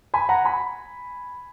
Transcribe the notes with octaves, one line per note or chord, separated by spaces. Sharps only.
G#5 B5
F#5 A#5
G#5 B5